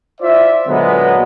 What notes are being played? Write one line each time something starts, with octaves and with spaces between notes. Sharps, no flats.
E4 F4 C5 D5 E5
A#2 D3 F#3 G#3 B3